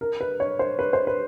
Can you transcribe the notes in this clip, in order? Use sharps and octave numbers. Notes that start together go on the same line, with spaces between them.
A#4
B4
C#5
C5
B4
C5
B4